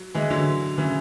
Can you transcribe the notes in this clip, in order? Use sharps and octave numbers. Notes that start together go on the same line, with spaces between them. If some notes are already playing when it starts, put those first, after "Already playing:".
Already playing: F#3
E3 G#3
D3 F#3
C#3 E3